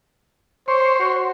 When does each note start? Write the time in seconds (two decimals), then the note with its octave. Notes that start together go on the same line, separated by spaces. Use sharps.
0.68 C5 C#5 C6
1.00 F#4